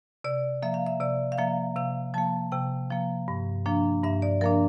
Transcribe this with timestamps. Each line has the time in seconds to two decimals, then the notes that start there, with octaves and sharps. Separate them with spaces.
0.24 C3 D5
0.62 F3 A#3 E5
0.74 F5
0.87 E5
1.00 C3 D5
1.32 F5
1.38 F3 A#3 E5
1.76 C3 F5
2.14 F3 A#3 A5
2.52 C3 G5
2.90 F3 A#3
3.28 G2
3.66 F3 A#3 D4
4.03 G2 E5
4.22 D5
4.41 F3 A#3 D4 A#4